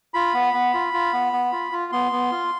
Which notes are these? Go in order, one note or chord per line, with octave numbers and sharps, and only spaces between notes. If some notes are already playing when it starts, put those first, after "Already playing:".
F4 B5
B3
B3
F4
F4
B3
B3
F4
F4
B3 C6
B3
F4